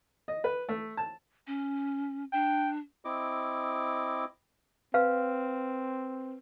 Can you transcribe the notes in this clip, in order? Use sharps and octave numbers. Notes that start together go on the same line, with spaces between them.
D#5
B4
A3
A5
C#4
D4 G5
C4 E4 D#5 D6
C4 B4 F5 F6